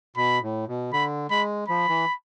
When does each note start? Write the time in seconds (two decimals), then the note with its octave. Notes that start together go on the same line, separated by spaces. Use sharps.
0.16 B2 B5
0.42 A2
0.68 B2
0.93 D3 B5
1.30 G#3 B5
1.68 F3 B5
1.88 E3